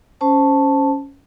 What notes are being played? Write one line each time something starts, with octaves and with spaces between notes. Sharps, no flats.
C#4 C5 A5